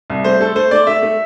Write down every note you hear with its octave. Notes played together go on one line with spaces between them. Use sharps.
C2
A3 C5
A3 A4
A3 C5
A3 D5
A3 E5
A3